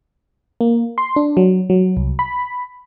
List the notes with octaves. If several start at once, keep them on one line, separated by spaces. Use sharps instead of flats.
A#3
C6
D4
F#3
F#3
C2
B5